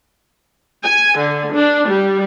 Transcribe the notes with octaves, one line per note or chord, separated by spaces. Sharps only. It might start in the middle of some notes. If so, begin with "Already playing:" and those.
G#5
D3
D4
G3